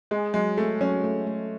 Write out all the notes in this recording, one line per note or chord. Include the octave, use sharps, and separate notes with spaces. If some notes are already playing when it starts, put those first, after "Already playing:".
G#3 G#4
F#3 G#3
A3 G#4
F#3 C#4
A3
A3